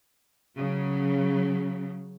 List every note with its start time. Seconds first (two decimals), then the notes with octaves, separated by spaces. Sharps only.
0.56 C#3 F#3